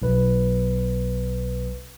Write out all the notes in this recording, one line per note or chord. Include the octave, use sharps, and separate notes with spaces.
B1 B4